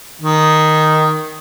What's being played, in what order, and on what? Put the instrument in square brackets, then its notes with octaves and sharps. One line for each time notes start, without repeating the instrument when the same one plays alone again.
[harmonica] D#3